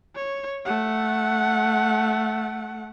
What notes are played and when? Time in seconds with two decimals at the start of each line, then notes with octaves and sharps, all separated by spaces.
0.16 C#5
0.66 A3 F#5